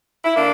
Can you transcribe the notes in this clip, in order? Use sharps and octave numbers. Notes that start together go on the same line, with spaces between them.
E4
D3 A#3 D4